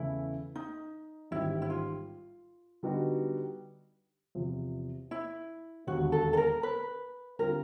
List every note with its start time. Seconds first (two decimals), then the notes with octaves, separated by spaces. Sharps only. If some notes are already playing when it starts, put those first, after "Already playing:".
Already playing: E2 C#3 E3 A3 E4
0.56 D#4
1.31 A1 G#2 D#3 G3 E4
1.62 E4
1.70 F4
2.83 D3 G3 B3 D#4 F#4
4.35 E2 C3 F3
5.11 E4
5.87 E1 D#2 D3 F#4
6.12 A4
6.33 A4
6.37 A#4
6.63 B4
7.39 D3 G3 C4 F4 A#4